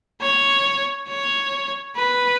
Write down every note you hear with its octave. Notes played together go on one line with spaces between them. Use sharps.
C#5
C#5
B4